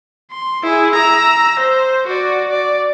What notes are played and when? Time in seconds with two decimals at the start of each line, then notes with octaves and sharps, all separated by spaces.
0.32 C6
0.63 E4 G#4
0.95 A#5 E6
1.60 C5
2.07 F#4 D5
2.50 D5